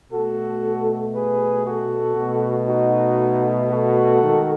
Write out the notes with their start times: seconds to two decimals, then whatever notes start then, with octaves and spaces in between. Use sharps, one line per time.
0.11 B2 A3 F#4 A4
1.15 G#4 B4
1.66 F#4 A4
2.16 B2 A3
2.68 D#4 F#4
3.71 F#4 A4
4.22 D#3 G#3